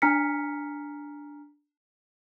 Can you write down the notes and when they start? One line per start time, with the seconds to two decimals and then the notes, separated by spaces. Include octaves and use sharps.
0.02 D4 G#5 A#5 F6 B6 C#7